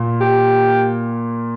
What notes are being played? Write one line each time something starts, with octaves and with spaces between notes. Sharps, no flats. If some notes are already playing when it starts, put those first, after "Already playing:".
Already playing: A#2 A#3
G4